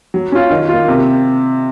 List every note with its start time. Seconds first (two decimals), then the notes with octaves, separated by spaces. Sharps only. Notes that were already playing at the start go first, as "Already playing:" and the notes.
0.14 F#3
0.32 C#4 F4
0.51 D#3
0.69 A#3 F4
0.88 C3